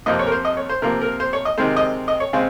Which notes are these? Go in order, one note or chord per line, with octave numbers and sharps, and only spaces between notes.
F2 C3 F3 A#3 D#5
C#5
A#4
C5
D#5
C#5
C5
C3 F3 A#3 A#4
A#4
C5
C#5
D#5
C3 D#3 G#3 C4 C5
D#5
D#5
C#5
C#3 G#3 C4